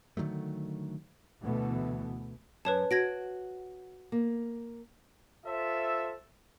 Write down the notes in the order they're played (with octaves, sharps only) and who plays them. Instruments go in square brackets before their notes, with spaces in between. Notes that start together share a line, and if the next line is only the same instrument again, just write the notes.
[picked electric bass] D3 D#3 F#3 A3
[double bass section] D2 B2 E3 A3 B3
[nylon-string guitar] F#2 [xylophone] B4 C#5 A5
[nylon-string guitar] F#4 [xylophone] G#6 A#6 D7
[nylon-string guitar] A#3
[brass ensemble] F4 A4 C5 E5